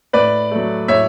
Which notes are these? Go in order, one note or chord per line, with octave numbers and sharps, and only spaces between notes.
A2 B4 D5
F#3 A3
A2 C#5 E5